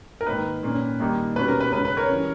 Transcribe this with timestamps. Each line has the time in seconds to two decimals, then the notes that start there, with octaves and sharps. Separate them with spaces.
0.21 A#4
0.26 G#2 D#3 A#3 D#4 B4
0.63 A#2 A#3 C#4
1.00 G2 D#3 A#3 D#4
1.36 B2 G3 C#4 B4
1.48 A#4
1.60 B4
1.73 C#3 G#3 C#4 B4
1.85 B4
1.97 A#4 C#5
2.09 E3 G3 C#4